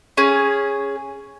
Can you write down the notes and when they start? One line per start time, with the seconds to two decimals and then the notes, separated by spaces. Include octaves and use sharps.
0.17 C#4 G#4